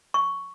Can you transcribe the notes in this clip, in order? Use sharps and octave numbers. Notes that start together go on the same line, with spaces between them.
C#6